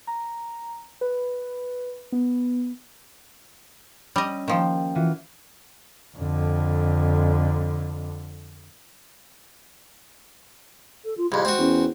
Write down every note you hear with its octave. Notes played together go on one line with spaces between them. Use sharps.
A#5
B4
B3
G3 C#4 D#5 E6
D#3 F3 A#3 G4 G5
E3 F4 F#4
F2 D3
A4
F4
C2 F2 G#4
G#3 C4 F#4
E2 C#4